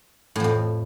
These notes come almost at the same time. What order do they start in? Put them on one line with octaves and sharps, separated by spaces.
A2 F3 F2